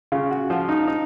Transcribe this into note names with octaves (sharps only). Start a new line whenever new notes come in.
C#3 F4
F#4
F3 F4
D#4
D#4